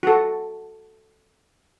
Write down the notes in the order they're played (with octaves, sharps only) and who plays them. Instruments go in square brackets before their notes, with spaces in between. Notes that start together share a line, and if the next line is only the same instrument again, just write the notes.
[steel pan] F#4 A4